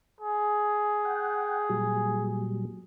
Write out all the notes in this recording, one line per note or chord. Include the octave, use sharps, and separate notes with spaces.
G#4
F#5 G5
A#2 F#3 G3